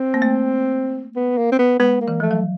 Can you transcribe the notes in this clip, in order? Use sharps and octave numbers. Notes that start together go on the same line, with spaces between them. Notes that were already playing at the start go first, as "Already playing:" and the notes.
Already playing: C4
A#3
A3
B3
A#3
C4
B3
G#3 B3
A#3
E3
F3 A3
F#3